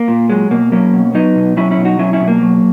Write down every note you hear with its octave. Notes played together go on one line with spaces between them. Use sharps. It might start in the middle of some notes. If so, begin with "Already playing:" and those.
Already playing: A#3
A#2
F#3 G#3
B2 A#3
F#3 A#3 C#4
B2
F#3 B3 D#4
B2
F#3 C#4 E4
C#4 E4
B2
D#4 F#4
F#3 C#4 E4
C#4 E4
B2
A#3
F#3